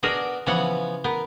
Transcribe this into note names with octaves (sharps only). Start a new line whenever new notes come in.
B3 D4 F#4 G#4 A#4
C#3 E3 F3 B3 C#4 F#5
B3 A#4